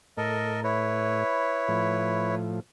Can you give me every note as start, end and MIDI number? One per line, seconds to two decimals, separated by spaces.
0.17 1.24 45
0.17 0.60 69
0.17 0.60 70
0.17 0.60 75
0.64 2.35 64
0.64 2.35 71
0.64 2.35 73
1.68 2.60 45
1.68 2.60 53